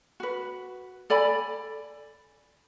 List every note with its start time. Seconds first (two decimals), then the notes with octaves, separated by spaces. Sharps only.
0.20 F#4 B4
1.10 A4 D5 G#5 B5